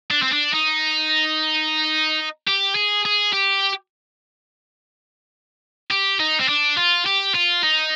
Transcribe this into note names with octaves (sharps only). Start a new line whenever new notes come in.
D4
C4
D4
D#4
G4
G#4
G#4
G4
G4
D#4
C4
D4
F4
G4
F4
D#4